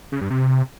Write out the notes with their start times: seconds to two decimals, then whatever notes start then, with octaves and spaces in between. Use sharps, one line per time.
0.12 C#3
0.21 G2
0.30 C3